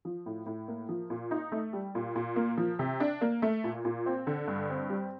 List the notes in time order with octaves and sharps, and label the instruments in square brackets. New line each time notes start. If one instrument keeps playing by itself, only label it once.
[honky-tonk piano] F3
A2
A2
A#3
F3
A#2
D#4
A3
G3
A#2
A#2
A#3
F3
C3
D4
A#3
A3
A#2
A#2
C4
D3
G2
C4
G3